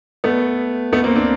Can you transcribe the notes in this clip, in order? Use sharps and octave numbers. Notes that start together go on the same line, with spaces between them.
A3 B3
A3 B3
A#3 C4
C4 D4